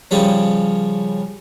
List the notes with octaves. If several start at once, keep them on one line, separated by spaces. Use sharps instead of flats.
C#3 F3 G3 C#4